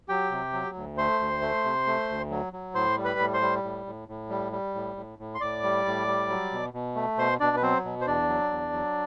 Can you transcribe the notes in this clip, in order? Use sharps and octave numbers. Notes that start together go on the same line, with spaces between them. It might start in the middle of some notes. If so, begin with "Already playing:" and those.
F#3 G4 G5
C3
F#3
D2
A3 C5 C6
D2
A3
C3
A3
D2
F#3
F#3
A2 C5 C6
G3
B4 B5
A2
C5 C6
G3
A2
A2
A2
G3
G3
A2
A2
A2
C6
A2 D5 D6
G3
A2
G3
F#3
B2
B2
A3
B2 C5 C6
B2 D4 D5
B4
F#3 C4 C5
B2
C5
E2 D4 D5
F#3
E2
F#3